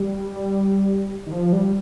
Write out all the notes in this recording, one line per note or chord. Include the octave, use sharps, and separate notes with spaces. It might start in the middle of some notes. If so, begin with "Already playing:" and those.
Already playing: G3
D#3
F3
G3